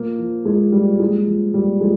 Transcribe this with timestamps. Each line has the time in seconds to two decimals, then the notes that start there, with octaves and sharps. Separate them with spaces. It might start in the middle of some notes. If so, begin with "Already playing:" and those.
Already playing: A#2 A#3
0.19 F3
0.45 A#2 G#3
0.72 F3 G3
1.00 A#2 G#3
1.26 F3
1.54 A#2 G3
1.81 F3 G#3